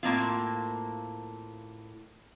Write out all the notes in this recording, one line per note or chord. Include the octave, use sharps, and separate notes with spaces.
A2 A#3 C4 F4